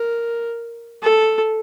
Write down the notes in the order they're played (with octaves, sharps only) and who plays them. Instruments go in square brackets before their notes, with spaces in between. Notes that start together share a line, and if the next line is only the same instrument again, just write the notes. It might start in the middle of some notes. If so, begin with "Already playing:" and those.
Already playing: [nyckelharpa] A#4
A4